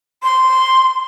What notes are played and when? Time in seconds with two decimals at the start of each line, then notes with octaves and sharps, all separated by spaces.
0.23 C6